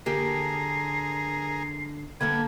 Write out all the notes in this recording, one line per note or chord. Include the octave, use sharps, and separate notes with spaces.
D3 A#3 G4 G#4 A#4 C7
D3 G3 A#3 B3 A4 G#6